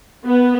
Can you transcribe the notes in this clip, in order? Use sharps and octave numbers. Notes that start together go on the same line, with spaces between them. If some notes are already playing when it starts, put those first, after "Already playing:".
B3